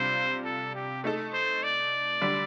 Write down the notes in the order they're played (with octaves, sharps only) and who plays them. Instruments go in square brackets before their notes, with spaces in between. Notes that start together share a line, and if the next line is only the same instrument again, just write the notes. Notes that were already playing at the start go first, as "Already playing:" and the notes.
Already playing: [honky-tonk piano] C3 G3 D4 F4 [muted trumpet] C5
[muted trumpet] A4
G4
[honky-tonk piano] A3 D#4 A4
[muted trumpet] C5
D5
[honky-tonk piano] D3 G3 D4